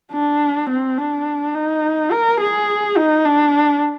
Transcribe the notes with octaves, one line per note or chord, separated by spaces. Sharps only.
D4
C4
D4
D#4
A#4
G#4
D#4
D4